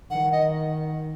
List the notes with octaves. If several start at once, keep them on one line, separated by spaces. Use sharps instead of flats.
D#3 F#5
D#5